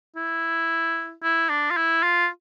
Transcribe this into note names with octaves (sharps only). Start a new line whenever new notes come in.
E4
E4
D4
F4
E4
F4